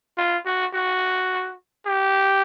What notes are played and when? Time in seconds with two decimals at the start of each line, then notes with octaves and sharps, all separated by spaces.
0.18 F4
0.46 F#4
0.74 F#4
1.86 G4